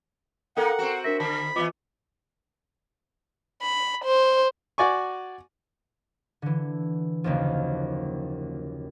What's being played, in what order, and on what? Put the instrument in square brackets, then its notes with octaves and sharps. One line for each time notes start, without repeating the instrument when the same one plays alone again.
[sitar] A#3 D#4 [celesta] A4 A#4 G5 [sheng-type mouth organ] F#5
[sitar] C4 F#4
[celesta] D4 A#4 A#6 [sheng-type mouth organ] E5
[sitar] D3 [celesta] A5 [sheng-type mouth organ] B5
[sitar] E3 G3 B3 [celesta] F4 D#5 D6
[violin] B5
C5
[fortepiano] F#4 D5 G#5 C#6
[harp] D3 E3
F#1 D#2 F3